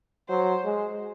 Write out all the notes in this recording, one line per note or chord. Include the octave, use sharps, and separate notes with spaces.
F#3 C5
G#3